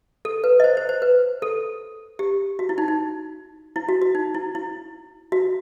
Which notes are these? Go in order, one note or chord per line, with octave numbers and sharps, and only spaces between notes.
A4
B4
D#5
C5
C5
C5
B4
A4
G4
F#4
E4
D#4
D#4
E4
F#4
F#4
D#4
E4
E4
F#4